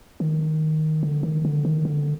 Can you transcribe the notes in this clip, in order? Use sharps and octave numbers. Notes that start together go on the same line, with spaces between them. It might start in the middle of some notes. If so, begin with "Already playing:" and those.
D#3
D3
D#3
D3
D#3
D3